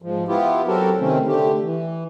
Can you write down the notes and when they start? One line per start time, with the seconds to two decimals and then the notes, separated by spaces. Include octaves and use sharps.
0.02 G#2 F3
0.28 B3 E4 F4 G4
0.67 F#3 C4 F#4 G4 A4 A#4
1.00 C3 D#3 A3 C4 C#4
1.28 D3 A3 G4
1.63 E3